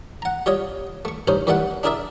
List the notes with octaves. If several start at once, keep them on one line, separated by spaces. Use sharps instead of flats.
F#5 A#5
G3 F4 C#5 D#5
A3 C#6
A1 G2 C#4 D#4 C5
E2 D#3 G3 A3 E4 F#5
D4 E4 G#4 A#4 D5 E5